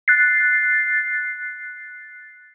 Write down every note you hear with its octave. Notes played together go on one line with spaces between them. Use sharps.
F#6 A6 C7